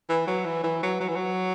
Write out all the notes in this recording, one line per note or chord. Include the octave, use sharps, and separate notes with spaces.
E3
F#3
E3
E3
F#3
F#3
E3
F#3